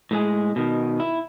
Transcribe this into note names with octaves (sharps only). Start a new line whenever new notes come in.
A2 G#3 G#4
B2 D#3
E4